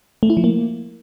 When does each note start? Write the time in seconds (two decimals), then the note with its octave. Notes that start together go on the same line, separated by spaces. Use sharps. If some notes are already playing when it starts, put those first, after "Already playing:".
0.23 A3
0.30 E4
0.37 F3
0.44 A#3